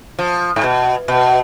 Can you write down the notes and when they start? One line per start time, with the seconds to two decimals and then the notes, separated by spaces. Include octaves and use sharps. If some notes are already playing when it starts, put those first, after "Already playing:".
0.19 F3
0.56 G#2
0.64 B2
1.08 B2